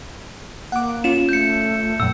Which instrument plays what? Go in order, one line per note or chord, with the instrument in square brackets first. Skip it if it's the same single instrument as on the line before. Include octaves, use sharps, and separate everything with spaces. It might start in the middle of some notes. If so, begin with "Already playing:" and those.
[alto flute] A#3 [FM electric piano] F#5 D6
[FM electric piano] C#4 F4 [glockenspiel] E7
[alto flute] A3 [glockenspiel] G6 C#7
[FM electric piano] F#2 A#2 [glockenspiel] E6